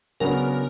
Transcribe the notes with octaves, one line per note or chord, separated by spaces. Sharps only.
C#3 F#3 B3 D4 A#4